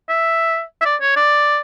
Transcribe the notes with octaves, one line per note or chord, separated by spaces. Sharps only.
E5
E5
D5
C#5
D5